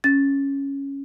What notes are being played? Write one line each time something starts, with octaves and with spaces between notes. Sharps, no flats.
C#4 A6